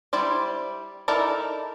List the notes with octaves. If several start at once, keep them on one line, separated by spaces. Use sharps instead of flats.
G3 E4 C5 D5
D#4 E4 A4 A#4 D5